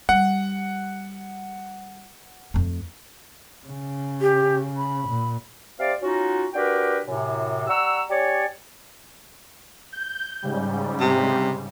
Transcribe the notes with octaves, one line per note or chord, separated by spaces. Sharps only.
G3 F#5
F2 A3
C#3
G4
B5
A#2
C3 D5 F5
F#3 C#4 D#4 F4 F#4
D4 F#4 G4 A#4 B4 G5
F#2 A2 C3
G3 F#5 A#5 C#6 E6
C#4 G4 C#5 D5
G6
G#2 C#3 G3
C3